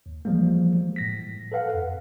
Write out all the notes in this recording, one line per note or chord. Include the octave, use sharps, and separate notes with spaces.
D#2
E3 F3 G3 G#3 A#3
A2 A#6 B6
A4 B4 F5 F#5
F2